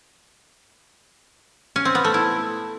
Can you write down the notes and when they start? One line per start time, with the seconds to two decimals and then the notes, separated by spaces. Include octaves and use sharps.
1.76 C#4
1.85 C4
1.95 B3
2.04 A3
2.14 E4